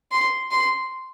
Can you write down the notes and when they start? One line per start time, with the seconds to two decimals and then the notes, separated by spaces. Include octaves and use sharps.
0.12 C6
0.51 C6